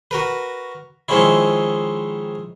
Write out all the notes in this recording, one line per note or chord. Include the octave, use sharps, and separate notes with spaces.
F#4 A#4 B4
D#3 F3 G#3 C4 C#4 E4